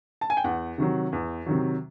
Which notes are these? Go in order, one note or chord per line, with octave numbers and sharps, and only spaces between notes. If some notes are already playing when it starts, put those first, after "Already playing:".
A5
G#5
G5
E2 F#5
C3 D#3 F#3
E2
C3 D#3 F#3